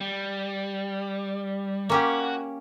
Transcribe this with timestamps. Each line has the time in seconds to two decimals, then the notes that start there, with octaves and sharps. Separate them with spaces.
0.01 G3
1.90 A#3 C#4 F#4 G4